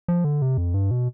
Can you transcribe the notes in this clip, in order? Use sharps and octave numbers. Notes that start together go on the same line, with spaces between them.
F3
D3
C3
F2
G2
B2